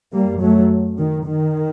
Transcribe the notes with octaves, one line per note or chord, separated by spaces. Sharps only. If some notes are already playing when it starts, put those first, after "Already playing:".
F#2 G3 A#3
F#3 A3
D#3
D#3